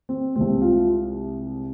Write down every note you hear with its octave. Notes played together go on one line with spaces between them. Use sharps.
C4
C2 C3 G#3 C4
F4